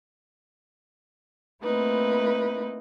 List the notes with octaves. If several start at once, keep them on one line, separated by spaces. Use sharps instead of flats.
A3 A#3 C4 D#4 E4 B4